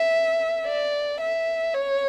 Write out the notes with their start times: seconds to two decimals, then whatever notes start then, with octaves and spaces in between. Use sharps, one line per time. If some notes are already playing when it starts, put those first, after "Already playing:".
Already playing: E5
0.67 D5
1.21 E5
1.74 C#5